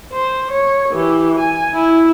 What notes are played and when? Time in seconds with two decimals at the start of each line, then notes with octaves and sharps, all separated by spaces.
0.13 C5
0.51 C#5
0.92 E3 G4
1.39 G#5
1.74 E4